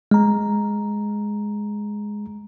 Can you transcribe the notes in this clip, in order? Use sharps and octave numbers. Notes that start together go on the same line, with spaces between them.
G#3 A#5